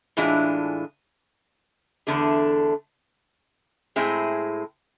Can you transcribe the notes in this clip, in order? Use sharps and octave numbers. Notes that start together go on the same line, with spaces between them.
A2 E3 G#3 D4 F4
E2 D3 A3 D4 G#4
A2 G#3 C4 E4 G#4